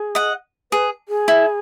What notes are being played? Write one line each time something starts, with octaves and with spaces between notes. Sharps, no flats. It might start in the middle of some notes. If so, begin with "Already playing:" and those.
Already playing: G#4
D#5 F#5
G#4 B4
G#4
E4